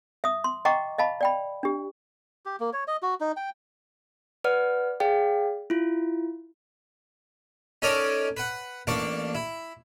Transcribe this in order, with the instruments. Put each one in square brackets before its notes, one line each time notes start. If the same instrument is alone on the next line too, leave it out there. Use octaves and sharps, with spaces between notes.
[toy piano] E5 D#6
C6
D#5 F#5 G5 A#5 C#6 D6
D#5 F5 A5 B5
D5 G5 B5
D4 G4
[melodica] G4
A#3
C#5
D#5
F#4
D#4
G5
[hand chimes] B4 D5 F#5 F6
G#4 D5 F5 G5
E4 F4
[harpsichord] C#4 D#4 A4 A#4 C#5 D5
B4 F#5
A1 A#3 D4 C#6 D6
E4